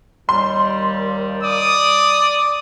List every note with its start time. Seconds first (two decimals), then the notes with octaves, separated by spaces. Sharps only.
0.29 D#2 G3 C6
1.43 D5 D#6